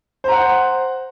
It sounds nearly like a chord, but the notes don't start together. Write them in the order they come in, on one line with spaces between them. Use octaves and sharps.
C5 A#5 F#5